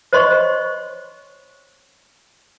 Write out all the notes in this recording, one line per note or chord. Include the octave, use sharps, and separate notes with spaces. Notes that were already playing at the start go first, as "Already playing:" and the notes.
C5 C#5 D#5 C6 C#6